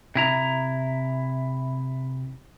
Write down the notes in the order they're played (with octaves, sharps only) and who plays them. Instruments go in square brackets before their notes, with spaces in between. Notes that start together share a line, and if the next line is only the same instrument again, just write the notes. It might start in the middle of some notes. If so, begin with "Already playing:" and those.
[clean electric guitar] C3 E4 A#5